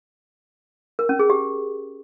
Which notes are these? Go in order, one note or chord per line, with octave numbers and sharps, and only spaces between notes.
A#4
C#4
G#4
G4